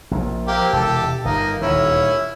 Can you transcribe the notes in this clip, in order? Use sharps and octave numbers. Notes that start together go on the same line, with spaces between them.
A#1 A#2
A#3 C4 G4
E1 C3 G4 A4
G1 A#3 D#4
D#1 D2 D#3 C#4 E4